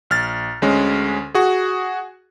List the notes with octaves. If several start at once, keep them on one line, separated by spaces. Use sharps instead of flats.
A#1 F6 A6
D2 G#3 C#4
F#4 G#4